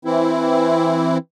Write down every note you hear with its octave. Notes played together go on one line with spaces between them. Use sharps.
E3 C4 E4